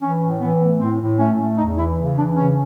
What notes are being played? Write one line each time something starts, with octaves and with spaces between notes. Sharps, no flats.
E3 C#4
A2
E3 B3
A3
A2 C4
A2
A3 C#4
A3
E2 D#4
E3 E4
C#3
E3 D4
C#3 C#4